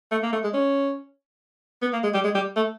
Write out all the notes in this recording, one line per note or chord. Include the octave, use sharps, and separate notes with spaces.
A3
A#3
A3
G#3
C#4
B3
A#3
G#3
G3
G#3
G3
A3